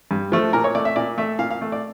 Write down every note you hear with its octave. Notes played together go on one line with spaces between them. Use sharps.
G2
F3 A3
A#2 A#4
C#5
A3 D5
E5
A#2 D5
A3 E5
A#2 F5
F5
A3
D5